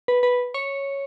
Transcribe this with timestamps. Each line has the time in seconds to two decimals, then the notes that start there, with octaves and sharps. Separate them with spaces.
0.08 B4
0.23 B4
0.54 C#5